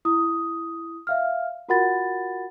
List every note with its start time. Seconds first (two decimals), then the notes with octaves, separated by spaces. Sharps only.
0.05 E4 D#6
1.07 E5 F5 F6
1.69 F4 F#4 A#4 F#5 B5 A6